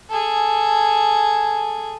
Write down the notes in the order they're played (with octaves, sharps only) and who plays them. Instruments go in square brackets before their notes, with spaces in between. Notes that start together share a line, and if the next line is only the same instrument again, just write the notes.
[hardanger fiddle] G#4 A4